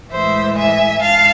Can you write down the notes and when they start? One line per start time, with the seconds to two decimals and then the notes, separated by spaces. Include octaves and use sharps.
0.10 A2 E3 G#3 C5 E5
0.57 E5 G#5
1.01 G#2 F5 A5